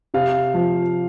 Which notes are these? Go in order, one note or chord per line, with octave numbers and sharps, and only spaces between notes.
C3 F5
F3